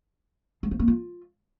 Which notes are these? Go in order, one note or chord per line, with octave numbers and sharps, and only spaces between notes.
G#3
A3
A#3
F4